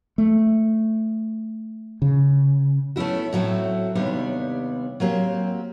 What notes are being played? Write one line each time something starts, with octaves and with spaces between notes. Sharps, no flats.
A3
C#3
A3 B3 C#4 E4 F#4
A2 F#3 G3 A3 C4
D#2 C3 G3 B3 D4 C#5
F#3 A#3 C4 G4